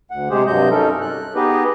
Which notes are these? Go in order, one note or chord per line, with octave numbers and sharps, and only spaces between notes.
D2 F#5
C3 G#3 G4 G#4 C5
G2 C3 F#3 D#5 G6
C#4 D#4 A4 A#4
F#6
B3 D#4 G4 G#4 B4 D#5